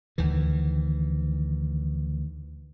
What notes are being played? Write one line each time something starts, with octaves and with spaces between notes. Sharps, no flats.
D2 D#3 E3